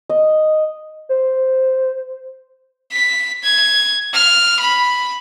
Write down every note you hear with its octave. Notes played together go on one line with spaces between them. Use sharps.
D#5
C5
B6
G#6
F6
B5